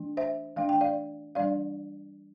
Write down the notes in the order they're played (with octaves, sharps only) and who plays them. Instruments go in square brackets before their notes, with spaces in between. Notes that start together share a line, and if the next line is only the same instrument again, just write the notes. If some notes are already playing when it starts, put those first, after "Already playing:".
Already playing: [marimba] E3 A3 D4
C5 E5
E3 A3 D4 F5
G5
D5 F5
E3 G3 D4 D5 F5